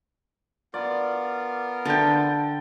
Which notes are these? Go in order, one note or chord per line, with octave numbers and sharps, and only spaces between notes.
B3 F4 A#4 D5
D3 G5 A5